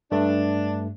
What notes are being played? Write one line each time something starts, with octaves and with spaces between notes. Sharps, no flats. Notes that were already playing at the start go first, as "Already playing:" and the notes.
G2 A3 D4